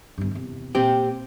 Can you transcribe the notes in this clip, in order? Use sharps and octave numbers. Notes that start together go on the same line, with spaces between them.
G1 G2
E2 C3
A#2 C4 G4